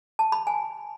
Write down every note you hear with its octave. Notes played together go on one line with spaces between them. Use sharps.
A5
B5
G#5